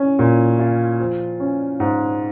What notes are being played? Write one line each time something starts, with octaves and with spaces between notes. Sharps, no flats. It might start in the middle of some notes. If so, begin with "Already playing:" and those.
Already playing: C#4
A#2
F4
F3
C#4
G#2